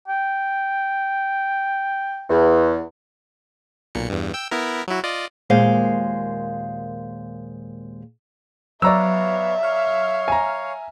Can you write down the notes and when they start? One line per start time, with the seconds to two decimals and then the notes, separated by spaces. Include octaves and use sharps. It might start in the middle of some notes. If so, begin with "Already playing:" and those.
0.08 G5
2.30 E2
3.95 B1 A#2 C#7
4.10 E2 G2
4.34 G5 E6
4.51 B3 E4 A#4
4.88 F#3 E4 F#4
5.04 F4 D5 D#5
5.50 D#2 A#2 G#3 C5 F5
8.82 F#3 B3 C#5 D5 E5 F5 A#5 E6
9.63 C#5 F5 F6
10.28 G#5 A#5